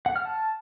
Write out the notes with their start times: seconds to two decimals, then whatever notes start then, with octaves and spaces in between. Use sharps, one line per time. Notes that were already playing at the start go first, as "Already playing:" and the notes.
0.06 F#5
0.16 F6
0.25 A5